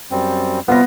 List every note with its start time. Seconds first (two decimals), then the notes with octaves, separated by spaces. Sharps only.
0.11 F#2 G3 C4
0.68 C3 G3 B3 F4 A#6